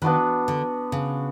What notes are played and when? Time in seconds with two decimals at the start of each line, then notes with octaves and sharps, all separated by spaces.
0.02 D#3 B3 D4 F#4 B4
0.48 D3
0.92 C#3